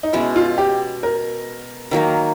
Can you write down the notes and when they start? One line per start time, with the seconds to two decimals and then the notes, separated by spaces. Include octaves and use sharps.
0.03 D#4
0.13 B2 G#3 C#4 E4
0.36 F4
0.58 G4
1.03 A#4
1.91 D#3 F#3 A#3 D#4